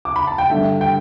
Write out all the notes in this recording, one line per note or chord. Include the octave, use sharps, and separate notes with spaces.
D6
B5
A5
G5
G2 D3 A3 E5
G5